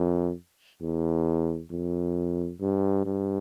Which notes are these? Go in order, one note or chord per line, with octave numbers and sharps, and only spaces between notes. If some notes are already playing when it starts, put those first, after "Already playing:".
Already playing: F2
E2
F2
G2
G2